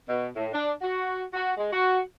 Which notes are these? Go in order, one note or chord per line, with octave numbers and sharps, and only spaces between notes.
B2
A2
D4
F#4
F#4
G#3
F#4